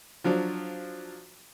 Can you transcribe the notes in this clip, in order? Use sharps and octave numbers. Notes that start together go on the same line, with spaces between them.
F3 F#3 D4